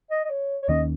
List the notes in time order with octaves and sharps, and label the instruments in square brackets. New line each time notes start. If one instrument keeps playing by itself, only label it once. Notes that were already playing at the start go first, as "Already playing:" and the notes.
[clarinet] D#5
D#5
C#5
C#5
[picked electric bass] D#2 D#3 A#3 C#4 [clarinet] D#5